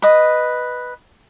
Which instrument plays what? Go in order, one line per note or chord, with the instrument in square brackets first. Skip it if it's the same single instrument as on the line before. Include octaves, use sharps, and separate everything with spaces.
[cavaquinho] B4 D#5